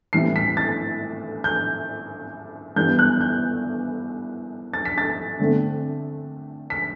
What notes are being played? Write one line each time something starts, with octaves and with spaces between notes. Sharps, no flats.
A2 E3 G3 C4 C7
B6
A6
G6
G2 E3 G3 B3 D4 G6
F#6
G6
A6
B6
A6
D3 A3 C4
B6